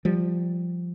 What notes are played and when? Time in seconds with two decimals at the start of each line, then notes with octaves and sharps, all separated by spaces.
0.05 F3 G3